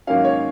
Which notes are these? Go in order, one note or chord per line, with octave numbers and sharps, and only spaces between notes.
G#2 D#3 F#3 A#3 C#4 F5
C#5